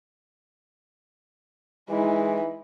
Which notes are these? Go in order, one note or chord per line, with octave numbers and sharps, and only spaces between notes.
E3 G#3 D#4 E4